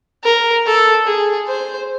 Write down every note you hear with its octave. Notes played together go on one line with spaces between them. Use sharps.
A#4
A4
G#4
C5